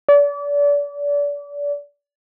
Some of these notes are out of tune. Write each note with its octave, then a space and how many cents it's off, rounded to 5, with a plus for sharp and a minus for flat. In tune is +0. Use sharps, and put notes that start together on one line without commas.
D5 -30